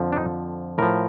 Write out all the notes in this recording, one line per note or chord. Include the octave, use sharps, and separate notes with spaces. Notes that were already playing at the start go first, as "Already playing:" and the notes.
Already playing: F2 D3 F3
D4
D#4
A2 F3 A#4